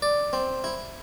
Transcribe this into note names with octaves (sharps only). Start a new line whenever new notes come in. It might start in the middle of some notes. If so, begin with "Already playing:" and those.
D5
C4
E4